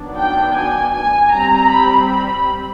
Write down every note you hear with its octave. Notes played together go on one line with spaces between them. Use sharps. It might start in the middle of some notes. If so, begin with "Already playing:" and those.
Already playing: D#3 F#3 B3 D4
G5
G#5
G#5
G3 C4 A#5
B5
B5